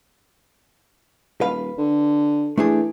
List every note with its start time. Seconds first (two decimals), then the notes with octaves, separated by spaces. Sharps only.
1.41 D#1 B4 F5
1.78 D3
2.58 E3 A3 D4 G#4